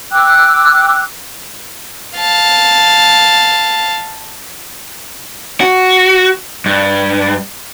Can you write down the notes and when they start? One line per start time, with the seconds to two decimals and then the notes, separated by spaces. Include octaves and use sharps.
0.12 G5 D6 E6 F#6
2.18 F5 A5
5.61 F#4
6.66 G2